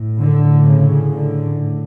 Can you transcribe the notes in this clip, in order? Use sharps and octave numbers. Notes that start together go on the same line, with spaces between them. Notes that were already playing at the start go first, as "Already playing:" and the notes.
Already playing: A2
D3
C#3
D3
A2